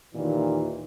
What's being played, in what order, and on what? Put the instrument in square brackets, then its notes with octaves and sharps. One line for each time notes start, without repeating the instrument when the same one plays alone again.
[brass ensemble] D#2 A#2 D#3 E3